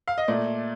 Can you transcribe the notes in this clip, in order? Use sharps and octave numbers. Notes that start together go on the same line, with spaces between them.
F5
D#5
A#2 A3 D5